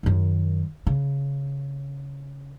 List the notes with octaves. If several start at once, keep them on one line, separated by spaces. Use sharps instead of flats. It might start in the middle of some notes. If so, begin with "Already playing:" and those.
F#2 D#3
C#3